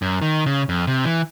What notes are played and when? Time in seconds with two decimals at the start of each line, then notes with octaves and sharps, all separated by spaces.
0.02 F#2
0.22 D#3
0.46 C#3
0.69 F2
0.87 C3
1.05 E3